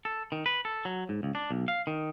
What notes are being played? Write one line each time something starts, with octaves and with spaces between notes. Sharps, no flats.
A4
D#3
B4
A4
F#3
G#2
C#2
D4
B1
F5
D#3